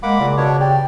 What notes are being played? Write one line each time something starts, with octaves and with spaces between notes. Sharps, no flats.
G#3 A#3 F#5 B5 D6
A#2 C#3
B2 D4 C#5
G4 D5